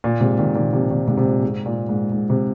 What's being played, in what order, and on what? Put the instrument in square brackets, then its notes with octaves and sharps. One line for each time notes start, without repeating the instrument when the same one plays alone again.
[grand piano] A#2
G#2 C3
A#2 D#3
A#2 D#3
C3 F3
A#2 D#3
G#2 C3
C3
A#2
G#2
A#2
G#2
G#2
C3